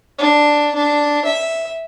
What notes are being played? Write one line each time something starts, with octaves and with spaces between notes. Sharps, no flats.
D4
D4
E5